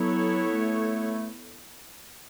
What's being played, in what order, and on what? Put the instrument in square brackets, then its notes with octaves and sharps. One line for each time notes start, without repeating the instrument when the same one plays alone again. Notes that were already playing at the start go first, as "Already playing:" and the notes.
Already playing: [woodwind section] F#3 [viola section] B3 E4 A4 C#5
[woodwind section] A3